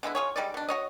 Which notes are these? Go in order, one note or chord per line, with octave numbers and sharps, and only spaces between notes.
D3 G#3 B3 E4
F4 G#4 C#5
G3 G#3 D#4 D5
B2 D4
F#4 C#5 D#5